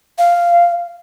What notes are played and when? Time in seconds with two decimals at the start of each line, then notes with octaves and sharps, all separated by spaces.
0.18 F5